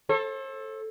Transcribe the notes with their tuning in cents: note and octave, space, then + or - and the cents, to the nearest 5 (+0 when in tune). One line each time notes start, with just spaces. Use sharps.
A4 +0 C5 +45